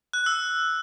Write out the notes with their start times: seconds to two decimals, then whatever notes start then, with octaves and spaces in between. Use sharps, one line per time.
0.13 F#6
0.26 E6